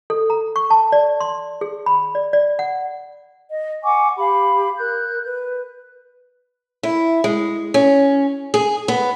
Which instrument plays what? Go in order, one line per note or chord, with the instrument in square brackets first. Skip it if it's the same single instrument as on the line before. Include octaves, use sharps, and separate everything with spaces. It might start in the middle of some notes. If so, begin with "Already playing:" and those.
[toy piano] A4
A#5
C#6
A5
D5
C6
G#4
B5
D5
D5
F#5
[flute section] D#5
F#5 G#5 C#6 D6
G4 F5 B5
A#4 F#6 G6
B4
[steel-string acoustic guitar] E4
G#3
C#4
G#4
B3